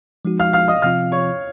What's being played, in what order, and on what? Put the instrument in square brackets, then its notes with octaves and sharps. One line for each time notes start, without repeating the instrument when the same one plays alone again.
[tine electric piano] F3 G#3 D#4 F#4
[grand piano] F5 F6
F5 F6
D#5 D#6
[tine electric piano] C3 F3 C4 F4 [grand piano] F5 F6
[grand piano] C#5 C#6